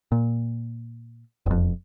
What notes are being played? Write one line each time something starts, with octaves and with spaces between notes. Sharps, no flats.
A#2
E1 F2